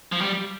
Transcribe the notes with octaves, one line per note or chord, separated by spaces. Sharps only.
F3
G3